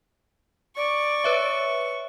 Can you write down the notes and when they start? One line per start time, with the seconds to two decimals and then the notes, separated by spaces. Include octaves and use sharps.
0.77 D5 C#6
1.24 B4 C#5 E5